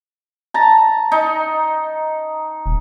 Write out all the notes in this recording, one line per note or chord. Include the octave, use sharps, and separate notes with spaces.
A5 A#5
D#4
D#1